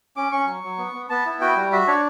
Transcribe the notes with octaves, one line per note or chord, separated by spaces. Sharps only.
C#4 D6
C#4 C#6
F#3
F#3
B3
B3
B3 A5
E4
F#4 G5
G3
F#4 E5
D4 C#5